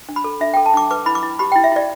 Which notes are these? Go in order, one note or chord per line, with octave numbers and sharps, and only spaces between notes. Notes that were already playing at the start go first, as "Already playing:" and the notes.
D4
B5
A4
D4 E5
A4 G5
A5
D4 D6
B4 D6
E4 B5
D6
E4
G4 B5
E4 G5
E5
E4 D5